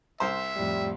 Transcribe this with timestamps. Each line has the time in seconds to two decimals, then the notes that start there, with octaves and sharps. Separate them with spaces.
0.20 C2 C5 E5
0.56 F2 A2 G3